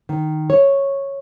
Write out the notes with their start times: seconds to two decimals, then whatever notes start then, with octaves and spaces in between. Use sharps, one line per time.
0.09 D#3
0.50 C#5